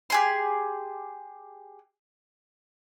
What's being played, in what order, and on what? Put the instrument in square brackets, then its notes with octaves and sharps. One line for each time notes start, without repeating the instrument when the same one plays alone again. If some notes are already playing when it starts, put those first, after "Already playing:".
[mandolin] G4 G#4 C6